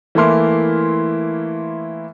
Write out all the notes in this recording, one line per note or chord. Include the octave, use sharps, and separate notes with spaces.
E3 A3 A#3 E4 C6 F6